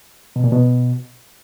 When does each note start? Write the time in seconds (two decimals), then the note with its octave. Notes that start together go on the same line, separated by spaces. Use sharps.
0.36 B2
0.44 A#2
0.52 B2